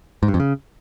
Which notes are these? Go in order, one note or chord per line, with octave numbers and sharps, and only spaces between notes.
G#2
G2
F2
C#3